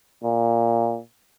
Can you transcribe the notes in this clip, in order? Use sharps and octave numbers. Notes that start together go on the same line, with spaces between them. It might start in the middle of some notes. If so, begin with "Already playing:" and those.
A#2